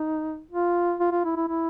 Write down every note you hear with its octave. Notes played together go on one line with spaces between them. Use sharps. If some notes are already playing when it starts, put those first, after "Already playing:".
Already playing: D#4
F4
F4
F4
E4
E4
E4